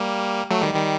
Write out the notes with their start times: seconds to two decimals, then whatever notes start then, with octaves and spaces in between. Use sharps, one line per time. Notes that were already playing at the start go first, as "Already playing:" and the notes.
Already playing: G3 A#3
0.50 F#3 A3
0.62 D#3 G3
0.74 D#3 G3